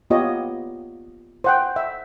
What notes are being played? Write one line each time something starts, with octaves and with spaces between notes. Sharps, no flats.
A#3 B3 F4 G4 C#5 D#5
C5 F#5 G5
E5